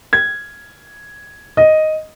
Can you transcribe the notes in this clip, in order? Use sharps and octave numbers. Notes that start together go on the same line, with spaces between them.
G#6
D#5